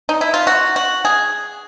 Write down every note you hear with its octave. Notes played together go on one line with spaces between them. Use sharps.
D#4
E4
F4
F#4
F#4
G#4